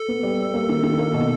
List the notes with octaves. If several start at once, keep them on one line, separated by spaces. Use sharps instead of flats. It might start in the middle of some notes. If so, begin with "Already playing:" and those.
Already playing: A4
B3
G3
G3
A#3
D#3
D#3
A#3
B2